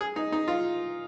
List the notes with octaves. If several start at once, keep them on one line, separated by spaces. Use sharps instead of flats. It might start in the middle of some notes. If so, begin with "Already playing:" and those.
G#4
D#4
D#4
F4